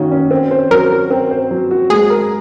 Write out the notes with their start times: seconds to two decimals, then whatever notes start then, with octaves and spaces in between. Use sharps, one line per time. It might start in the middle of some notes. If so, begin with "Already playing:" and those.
Already playing: D#3 A#3 C#4 F#4
0.11 C#4
0.31 C4
0.51 C5
0.71 F#3 A#4
0.91 F#4
1.10 C4
1.31 C5
1.51 F#3
1.71 F#4
1.90 G#3 G#4
2.10 A#4